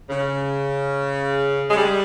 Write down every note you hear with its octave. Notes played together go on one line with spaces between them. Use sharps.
C#3
G#3
G3